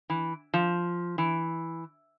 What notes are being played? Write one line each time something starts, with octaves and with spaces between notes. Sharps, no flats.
E3
F3
E3